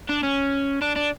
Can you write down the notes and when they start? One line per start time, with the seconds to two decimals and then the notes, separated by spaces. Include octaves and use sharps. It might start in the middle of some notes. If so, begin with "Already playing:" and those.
0.09 D4
0.23 C#4
0.82 D4
0.96 D4